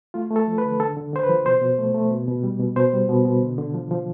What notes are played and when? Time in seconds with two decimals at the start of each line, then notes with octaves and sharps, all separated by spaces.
0.14 A3 F4
0.31 A3
0.36 A4
0.48 F3
0.58 B4
0.64 D3
0.80 D3 A4
0.96 D3
1.13 D3 C5
1.23 B4
1.29 F3
1.45 B2 C5
1.62 B2
1.78 A3
1.94 A3
2.11 B2
2.28 B2
2.43 G3
2.60 B2
2.76 B2 C5
2.93 G3
3.09 B2
3.25 B2
3.42 D3
3.58 D3
3.74 F3
3.91 F3